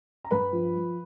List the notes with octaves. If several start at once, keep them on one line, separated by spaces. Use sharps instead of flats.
A#5
G2 B4 B5
F3